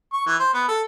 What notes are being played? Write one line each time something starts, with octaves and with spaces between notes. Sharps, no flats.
C#6
E3
C5
B3
A4